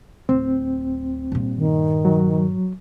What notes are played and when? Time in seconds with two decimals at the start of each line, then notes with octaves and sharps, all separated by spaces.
0.29 D1 C4
1.32 G2 A#2
1.57 D#3
2.05 F#3